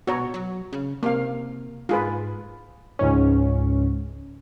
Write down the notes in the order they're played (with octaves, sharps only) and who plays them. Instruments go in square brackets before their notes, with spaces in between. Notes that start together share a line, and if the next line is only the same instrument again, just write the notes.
[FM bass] B2 [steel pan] F#4 C#5 A#5
[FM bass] F#3
C#3
[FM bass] C3 [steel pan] A#3 F5
[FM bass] G#2 [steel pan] F4 G#4 B4
[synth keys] C#2 G#2 C#4